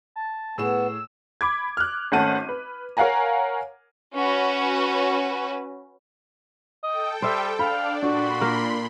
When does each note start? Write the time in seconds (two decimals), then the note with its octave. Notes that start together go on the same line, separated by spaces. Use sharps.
0.16 A5
0.58 A2 B3 G#4 E6 E7
1.41 B5 D6 G#6
1.77 F6 F#6
2.12 G#1 A3 C#4 F#5 A5 D#7
2.49 B4
2.97 A#4 C#5 F5 F#5 G#5 A#5
4.17 C#4 F#4 B4
6.83 A4 D#5 G5
7.22 G3 C5 E5
7.59 D4 D5 F5 B5
8.03 A#2 D4 F#4 B5 C6
8.41 A#3 A#4